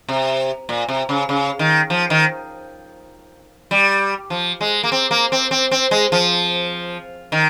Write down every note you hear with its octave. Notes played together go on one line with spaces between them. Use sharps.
C3
A#2
C3
C#3
C#3
D#3
F3
D#3
G3
F3
G#3
A#3
C4
A#3
C4
C4
C4
G#3
F3
D#3